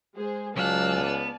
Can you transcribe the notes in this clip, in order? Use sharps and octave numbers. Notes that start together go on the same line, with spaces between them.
G#3 G#4 C5
C#2 F#3 D5 F5 G#5 A5 E6 F#6
B3